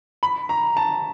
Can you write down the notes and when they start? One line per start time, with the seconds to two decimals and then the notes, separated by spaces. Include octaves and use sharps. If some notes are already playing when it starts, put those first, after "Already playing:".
0.23 B5
0.49 A#5
0.77 A5